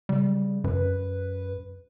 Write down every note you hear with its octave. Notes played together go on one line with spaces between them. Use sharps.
C#3 G3
F#2 B4